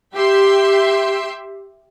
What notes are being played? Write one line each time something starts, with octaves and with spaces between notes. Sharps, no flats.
G4 E5 C6